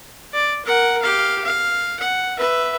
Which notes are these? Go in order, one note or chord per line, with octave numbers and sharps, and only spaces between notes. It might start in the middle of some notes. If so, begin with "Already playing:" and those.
D5
A#4 F#5
G4 F5
F5
F#5
B4 E5